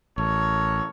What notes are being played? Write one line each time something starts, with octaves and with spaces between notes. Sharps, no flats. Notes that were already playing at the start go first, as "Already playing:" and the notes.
A1 A4 A#4 C#5